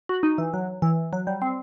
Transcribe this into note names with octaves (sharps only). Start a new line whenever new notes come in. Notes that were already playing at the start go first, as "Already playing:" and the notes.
F#4
D#4
E3
F#3
E3
F#3
G3
C4